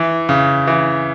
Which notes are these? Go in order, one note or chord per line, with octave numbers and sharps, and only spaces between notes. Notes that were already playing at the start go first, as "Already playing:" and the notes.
Already playing: E3
C#3
E3